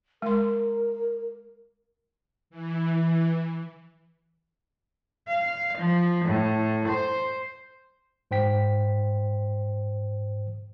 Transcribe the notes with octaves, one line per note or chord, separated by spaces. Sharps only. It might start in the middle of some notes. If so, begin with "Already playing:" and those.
G#3 A#4 C6
E3
F5
F3
A2
C5
G#2 C5 G5 B6